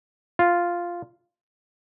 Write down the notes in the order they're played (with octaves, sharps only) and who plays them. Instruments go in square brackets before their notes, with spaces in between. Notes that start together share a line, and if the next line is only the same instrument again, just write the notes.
[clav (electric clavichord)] F4